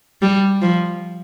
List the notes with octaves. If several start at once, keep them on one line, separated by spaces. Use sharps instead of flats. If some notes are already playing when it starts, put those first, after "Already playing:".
G3
F3